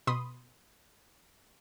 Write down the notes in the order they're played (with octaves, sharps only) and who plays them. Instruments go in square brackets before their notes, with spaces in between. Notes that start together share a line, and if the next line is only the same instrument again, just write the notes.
[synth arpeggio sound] B2 B5 C6 D#6